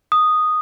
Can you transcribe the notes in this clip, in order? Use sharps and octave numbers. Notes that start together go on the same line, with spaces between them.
D#6